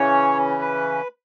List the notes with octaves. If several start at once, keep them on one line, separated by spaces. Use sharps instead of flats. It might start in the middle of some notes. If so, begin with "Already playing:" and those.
Already playing: C#3 E3 C#4 C#5
B4